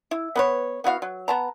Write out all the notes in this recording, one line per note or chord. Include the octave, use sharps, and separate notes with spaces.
E4
B3 B4 C#5
B3 E4 F#4 F5
F#3
B3 A5 A#5